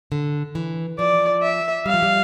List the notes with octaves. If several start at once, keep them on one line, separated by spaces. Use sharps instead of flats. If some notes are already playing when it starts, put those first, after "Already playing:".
D3
E3
F3 D5
E5
G3 F5
F3
G3